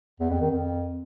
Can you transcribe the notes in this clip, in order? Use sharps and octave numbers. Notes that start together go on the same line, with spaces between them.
E2
F2
D#3
F2